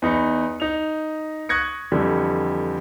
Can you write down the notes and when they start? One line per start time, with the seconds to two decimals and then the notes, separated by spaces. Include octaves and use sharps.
0.02 E2 D#4 B5 C#7
0.60 D#4 F7
1.49 C#6 D#6 F#6 G#6 A#6 C#7
1.92 F2 D3 E3 G3